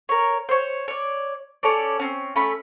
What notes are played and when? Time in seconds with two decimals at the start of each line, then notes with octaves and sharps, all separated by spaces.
0.09 A#4 C#5
0.49 C5 C#5
0.88 C#5 D5
1.63 C#4 A4 C#5 D5
1.99 C4 C#4
2.36 A3 C#4 B5